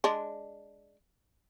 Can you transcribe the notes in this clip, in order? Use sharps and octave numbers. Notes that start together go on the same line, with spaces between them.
G#3 D4